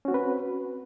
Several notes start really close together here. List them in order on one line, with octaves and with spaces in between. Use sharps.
C#4 F#4 C4 B4